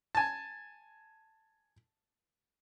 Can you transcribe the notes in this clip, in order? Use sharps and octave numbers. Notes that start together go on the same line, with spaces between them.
G#5 A5